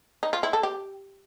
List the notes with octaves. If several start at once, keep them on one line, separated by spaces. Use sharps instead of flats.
D#4
F4
E4
A4
G4